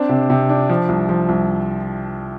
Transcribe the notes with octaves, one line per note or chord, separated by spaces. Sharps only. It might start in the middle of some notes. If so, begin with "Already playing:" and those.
Already playing: C4 D4
C3
C3
D4
F3
C2
F3
C2